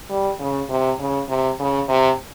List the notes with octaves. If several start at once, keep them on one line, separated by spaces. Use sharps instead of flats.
G3
C#3
C3
C#3
C3
C#3
C3